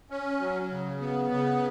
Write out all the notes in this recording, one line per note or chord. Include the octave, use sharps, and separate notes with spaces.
C#4
F#3
C#3
B3
C#3